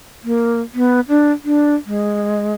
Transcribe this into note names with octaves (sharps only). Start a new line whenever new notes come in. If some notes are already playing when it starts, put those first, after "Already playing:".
A#3
B3
D4
D4
G#3